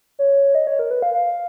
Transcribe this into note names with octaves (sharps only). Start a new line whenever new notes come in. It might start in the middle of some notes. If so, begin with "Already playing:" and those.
C#5
D#5
C#5
A#4
B4
F5
F5